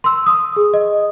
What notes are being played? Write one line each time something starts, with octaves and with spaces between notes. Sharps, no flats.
C6 E6
D#6
G#4
D#5